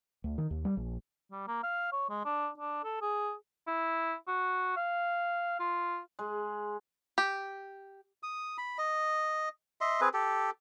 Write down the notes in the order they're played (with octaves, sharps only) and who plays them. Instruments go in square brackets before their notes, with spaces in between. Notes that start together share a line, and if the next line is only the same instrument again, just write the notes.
[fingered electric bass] D2
D#3
D#2
G3
A#1
[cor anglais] G3
A#3
F5
C#5
G#3
D4
D4
A4
G#4
E4
F#4
F5
F4
[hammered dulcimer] G#3
[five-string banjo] G4
[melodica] D#6
B5
D#5
D#5 E5 C6
C4 G#4 B4
G4 A4